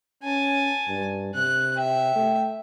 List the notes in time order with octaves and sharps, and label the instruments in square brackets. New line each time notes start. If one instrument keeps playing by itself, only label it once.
[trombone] C#4 [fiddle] G#5 A5
[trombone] G2
[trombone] C3 [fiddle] F#6
[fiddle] E5 [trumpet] G5
[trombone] A3